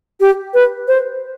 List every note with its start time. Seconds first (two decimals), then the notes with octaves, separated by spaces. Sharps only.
0.20 G4
0.54 B4
0.88 C5